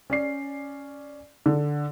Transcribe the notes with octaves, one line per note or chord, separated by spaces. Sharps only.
C#4 D5 C7
D3